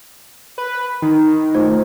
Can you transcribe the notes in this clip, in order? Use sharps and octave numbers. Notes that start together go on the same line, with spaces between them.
B4
D#3 D#4
A3 F4 C5